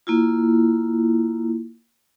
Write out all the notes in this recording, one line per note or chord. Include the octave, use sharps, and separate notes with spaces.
A#3 E4 F4